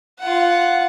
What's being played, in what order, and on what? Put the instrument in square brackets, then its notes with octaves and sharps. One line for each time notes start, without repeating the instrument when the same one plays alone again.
[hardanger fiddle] F4 F#5